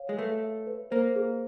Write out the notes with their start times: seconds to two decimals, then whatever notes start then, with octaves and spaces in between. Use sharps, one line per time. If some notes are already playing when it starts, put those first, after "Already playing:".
Already playing: C#5 F5
0.09 G#3
0.18 A3 B4
0.43 E5
0.67 B4
0.91 A#3 C5
1.16 G#4